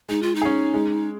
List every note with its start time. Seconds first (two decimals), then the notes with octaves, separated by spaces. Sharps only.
0.09 G#3 D#4
0.22 F4
0.35 D#4
0.42 C#4 G#4
0.74 G#3